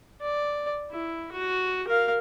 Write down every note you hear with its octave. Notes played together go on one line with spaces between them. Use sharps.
D5
E4
F#4
A#4 F5